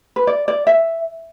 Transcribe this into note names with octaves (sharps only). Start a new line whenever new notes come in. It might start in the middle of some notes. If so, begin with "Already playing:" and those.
B4
D5
D5
E5